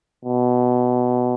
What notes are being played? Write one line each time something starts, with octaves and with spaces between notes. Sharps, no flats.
B2